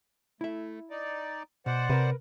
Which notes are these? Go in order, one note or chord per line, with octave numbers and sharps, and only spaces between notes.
A3 E4 E5
D#4 D5
B2 C5 D5 F#5
C3 A#4 B4